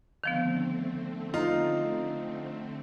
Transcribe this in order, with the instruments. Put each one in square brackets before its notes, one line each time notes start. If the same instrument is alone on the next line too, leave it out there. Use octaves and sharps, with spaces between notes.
[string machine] D3 A3 C4 [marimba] D#3 F3 B3
[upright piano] D#4 F4